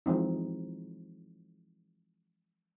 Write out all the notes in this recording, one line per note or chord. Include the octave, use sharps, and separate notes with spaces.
E3 F3 G#3 C4 D#4